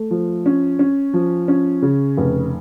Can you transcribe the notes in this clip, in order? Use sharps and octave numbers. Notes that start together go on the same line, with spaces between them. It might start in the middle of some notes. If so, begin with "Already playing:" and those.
Already playing: A3
F3
C#4
C#4
F3
C#4
C#3
F1